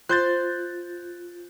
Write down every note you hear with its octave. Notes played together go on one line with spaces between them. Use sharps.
F4 C5 F#6 G6 A6